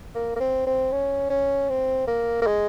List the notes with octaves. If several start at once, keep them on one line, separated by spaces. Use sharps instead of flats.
A#3
A#3
C4
C4
C#4
C#4
C4
A#3
A#3
G#3